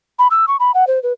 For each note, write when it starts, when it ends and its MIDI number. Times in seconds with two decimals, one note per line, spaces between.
0.19 0.28 83
0.31 0.45 88
0.48 0.56 85
0.60 0.71 83
0.74 0.87 78
0.87 1.01 72
1.03 1.13 71